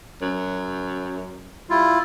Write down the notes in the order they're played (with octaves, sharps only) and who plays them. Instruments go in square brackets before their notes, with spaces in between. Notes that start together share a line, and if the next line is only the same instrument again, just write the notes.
[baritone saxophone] F#2
[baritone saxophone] G3 [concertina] E4 F4